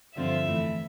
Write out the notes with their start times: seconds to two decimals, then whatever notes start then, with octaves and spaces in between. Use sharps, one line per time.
0.17 G2 D3 F3 C4 F4 E5
0.47 F2 E3 A3 E4